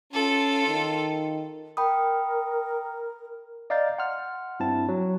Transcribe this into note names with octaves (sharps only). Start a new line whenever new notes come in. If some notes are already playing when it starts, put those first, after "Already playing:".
C#4 F4 A4
D#3
A#4 G5 B5 D#6
D5 D#5 F5 A#5 G6 A6
F#5 C6 F6
G2 C4 E4 A5
F#3